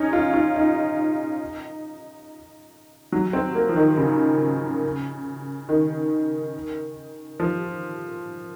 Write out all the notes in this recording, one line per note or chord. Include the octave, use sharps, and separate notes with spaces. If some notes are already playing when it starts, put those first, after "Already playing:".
Already playing: C#4 D#4
F4
F4
D#4
F#3
C4
A#3
F3
D#3
C#3
D#3
F3